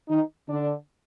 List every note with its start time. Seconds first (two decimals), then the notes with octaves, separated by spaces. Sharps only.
0.09 D#3 D#4
0.49 D3 D4